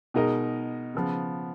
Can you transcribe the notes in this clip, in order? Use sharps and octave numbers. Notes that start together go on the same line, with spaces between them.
B2 G#3 D#4 A#4 D#5
C#3 F3 B3